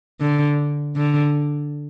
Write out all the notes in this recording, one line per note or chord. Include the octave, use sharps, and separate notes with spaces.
D3
D3